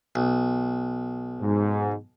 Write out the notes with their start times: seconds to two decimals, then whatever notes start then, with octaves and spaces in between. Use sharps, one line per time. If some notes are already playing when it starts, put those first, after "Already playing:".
0.15 B1
1.41 G#2